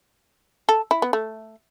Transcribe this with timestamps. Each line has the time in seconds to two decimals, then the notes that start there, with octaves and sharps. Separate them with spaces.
0.69 A4
0.91 E4
1.02 B3
1.13 A3